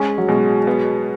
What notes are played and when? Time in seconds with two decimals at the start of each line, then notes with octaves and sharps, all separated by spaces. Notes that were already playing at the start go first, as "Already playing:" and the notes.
Already playing: G#3 C#4
0.18 F#3
0.29 B2 G#3
0.67 B3